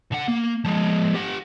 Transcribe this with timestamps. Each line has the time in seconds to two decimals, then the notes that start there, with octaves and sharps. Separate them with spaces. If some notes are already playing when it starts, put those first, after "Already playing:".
0.12 D3 F#5
0.28 A#3
0.64 F3 G#3
1.15 G4 F#5